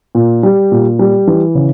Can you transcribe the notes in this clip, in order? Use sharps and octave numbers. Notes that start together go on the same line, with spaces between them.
A#2
G3
A#2
G3
E3
C#3